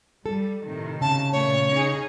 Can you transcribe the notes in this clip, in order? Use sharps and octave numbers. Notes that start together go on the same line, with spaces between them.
G3 A4
A2 C3 D#3
C#3 A5
A#2 A3 C#5
C#4 D#4 G#4